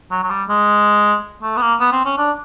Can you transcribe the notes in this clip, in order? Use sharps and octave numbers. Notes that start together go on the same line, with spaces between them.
F#3
F#3
G3
G#3
A3
B3
A#3
B3
C4
C#4
D4